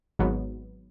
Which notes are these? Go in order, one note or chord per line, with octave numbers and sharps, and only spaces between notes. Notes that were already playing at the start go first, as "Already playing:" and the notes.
G#1 G#2 F#3 B3